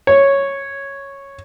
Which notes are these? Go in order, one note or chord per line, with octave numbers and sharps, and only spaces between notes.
C#5